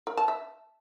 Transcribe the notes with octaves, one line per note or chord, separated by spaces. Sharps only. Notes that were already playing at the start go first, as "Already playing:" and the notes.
A#4
A5
E5